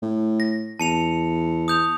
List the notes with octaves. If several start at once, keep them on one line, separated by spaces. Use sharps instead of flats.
A2
A#6
E2 A5 C#7 F7
D#6 G6 F7